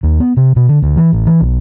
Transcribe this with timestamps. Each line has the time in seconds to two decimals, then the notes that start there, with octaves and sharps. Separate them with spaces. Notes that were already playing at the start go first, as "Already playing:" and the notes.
0.03 D#2
0.20 B3
0.37 C3
0.56 B2
0.68 D3
0.82 D2
0.96 E3
1.13 A1
1.27 E3
1.41 B1